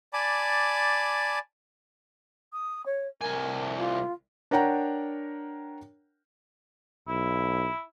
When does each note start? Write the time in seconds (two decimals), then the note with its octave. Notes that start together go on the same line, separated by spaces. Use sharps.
0.13 D5 G#5 A5 B5 D6
2.53 D#6
2.86 C#5
3.21 C2 A#4 G#5
3.78 F4
4.51 D4 A#4 C#5 F#5 G5 A#5
7.08 B1 E4